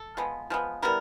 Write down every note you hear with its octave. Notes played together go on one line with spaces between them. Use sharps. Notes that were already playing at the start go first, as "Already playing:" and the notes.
Already playing: A4
F3 G#3 B3
F3 G#3 B3
G3 B3 E4 A#4